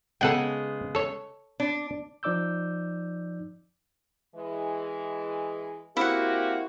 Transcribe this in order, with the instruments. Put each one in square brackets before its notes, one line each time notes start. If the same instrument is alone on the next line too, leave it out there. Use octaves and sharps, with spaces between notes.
[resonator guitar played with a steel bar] C#3 G#3 B3 [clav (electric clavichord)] A4 F#5 G5
[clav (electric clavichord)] A4 C#5
[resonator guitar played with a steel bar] D4
[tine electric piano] F3 D#4 D5 D6 E6 G6
[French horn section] E3 G#3
[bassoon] A#3 [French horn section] C4 F#4 G4 [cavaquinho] E4 F#5